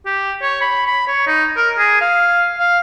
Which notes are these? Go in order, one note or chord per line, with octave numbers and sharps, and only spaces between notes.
G4
C#5
B5
B5
C#5
D#4
A#4
G#4
F5
F5